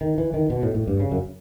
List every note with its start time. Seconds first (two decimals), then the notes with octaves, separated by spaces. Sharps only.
0.01 D#3
0.18 E3
0.34 D#3
0.50 B2
0.63 A2
0.74 A2
0.87 G2
1.00 C#3
1.12 F#2